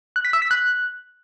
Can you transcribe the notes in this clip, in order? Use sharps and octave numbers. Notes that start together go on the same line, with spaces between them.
F#6
B6
E6
B6
F#6